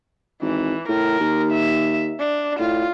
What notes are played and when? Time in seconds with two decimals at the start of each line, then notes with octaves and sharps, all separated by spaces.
0.42 G#1 E3
0.88 A2 A#4
1.20 D#2
1.52 E5
2.19 D4
2.59 A2 F4